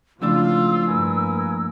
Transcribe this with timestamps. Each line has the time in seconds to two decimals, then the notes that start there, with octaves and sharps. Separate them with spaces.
0.22 F2 A2 C#3 F3 G#3 D4 F4 E6
0.87 G2 A#3 A#4 B4 G#5